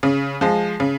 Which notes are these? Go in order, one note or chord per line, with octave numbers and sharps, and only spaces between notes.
C#3
F3 G#3
C#3